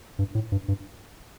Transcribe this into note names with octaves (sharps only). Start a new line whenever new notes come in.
G2
A2
G2
G2